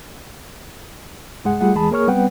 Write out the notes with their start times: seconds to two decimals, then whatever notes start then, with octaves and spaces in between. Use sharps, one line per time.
1.44 C2 G2 G#3 G#4 F#5
1.60 G3 A3 F4 G#4 F#5
1.75 E2 E3 G#3 G#4 A5 B5
1.91 A#3 G#4 A#4 C#5 C#6 F6
2.07 G3 B3 C4 B4 F#5 G5